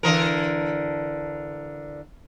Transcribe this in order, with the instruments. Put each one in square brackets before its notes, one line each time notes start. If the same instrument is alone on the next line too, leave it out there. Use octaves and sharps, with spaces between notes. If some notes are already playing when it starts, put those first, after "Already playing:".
[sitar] D3 E3 A#4